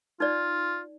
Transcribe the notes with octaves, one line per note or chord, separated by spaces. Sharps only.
D#4 F4 D5